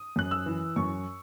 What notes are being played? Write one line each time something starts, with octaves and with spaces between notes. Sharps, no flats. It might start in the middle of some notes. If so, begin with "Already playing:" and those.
Already playing: D#6
F#2 F#6
E6
E3
F#2 C#6